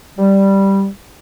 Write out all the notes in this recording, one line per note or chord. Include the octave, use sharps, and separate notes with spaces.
G3